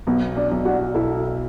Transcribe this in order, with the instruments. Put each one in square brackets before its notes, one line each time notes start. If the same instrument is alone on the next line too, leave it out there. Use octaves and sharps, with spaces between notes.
[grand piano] B1 [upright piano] B3
[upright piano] D4
[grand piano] B1
[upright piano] D4 F#4
[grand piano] B2 [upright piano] E4 A4